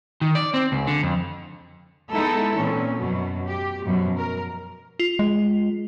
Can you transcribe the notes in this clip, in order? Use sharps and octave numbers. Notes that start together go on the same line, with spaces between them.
D#3
D5
C4
C#2
D3
F2
G#3 B3 D#4 E4 A4
A#2 E3 C4 C#4
F#2 B2 F#3
G4
F#2 B2 F3 F#3
A#4
F4
G#3